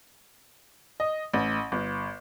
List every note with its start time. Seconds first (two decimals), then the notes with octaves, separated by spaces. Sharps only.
1.00 D#5
1.33 A1
1.72 G1